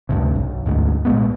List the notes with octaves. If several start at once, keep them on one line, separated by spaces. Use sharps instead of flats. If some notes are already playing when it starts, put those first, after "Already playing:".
D2 G2 C3
B1
D2 G#2
C2 A#2 G#3 B3